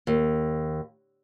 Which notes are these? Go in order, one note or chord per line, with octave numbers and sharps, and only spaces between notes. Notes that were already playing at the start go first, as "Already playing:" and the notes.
D#2